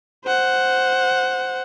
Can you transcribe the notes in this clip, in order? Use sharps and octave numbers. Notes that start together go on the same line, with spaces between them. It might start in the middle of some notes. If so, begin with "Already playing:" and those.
C5 F#5